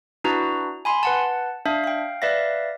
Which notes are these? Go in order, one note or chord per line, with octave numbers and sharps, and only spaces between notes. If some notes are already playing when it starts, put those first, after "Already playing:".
D4 E4 F#4 B4 A#5
G#5 B5 C6
B4 F#5 A5
D4 E5 F5
F5 G5
B4 D5 E5 F5 A#6